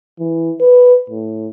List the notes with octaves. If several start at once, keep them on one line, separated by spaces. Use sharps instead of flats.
E3
B4
A2